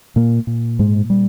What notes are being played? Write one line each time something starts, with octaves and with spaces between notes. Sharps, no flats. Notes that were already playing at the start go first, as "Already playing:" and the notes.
A#2 A#3
A#2
G#2 G#3
G3